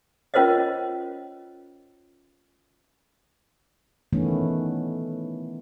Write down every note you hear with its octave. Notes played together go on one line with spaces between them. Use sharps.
C#4 F4 A#4 C5 C#5 D#5
D#3 E3 A3 B3 C#4